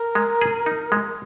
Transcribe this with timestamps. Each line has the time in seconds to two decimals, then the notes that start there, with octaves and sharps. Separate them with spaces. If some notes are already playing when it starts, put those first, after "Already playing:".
Already playing: A#4
0.15 G#3
0.41 G#4
0.66 D#4
0.92 G#3